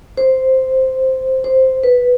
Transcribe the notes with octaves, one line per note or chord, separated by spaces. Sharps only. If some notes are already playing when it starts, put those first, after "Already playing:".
C5
C5
B4